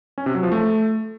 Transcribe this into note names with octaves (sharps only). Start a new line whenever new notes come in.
C#4
C3
F#3
F3
A3